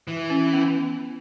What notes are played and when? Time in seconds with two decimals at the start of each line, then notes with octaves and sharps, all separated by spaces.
0.07 E3
0.30 C#4
0.53 B3